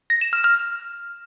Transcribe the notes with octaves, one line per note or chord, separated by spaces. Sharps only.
A#6
E7
F6
F6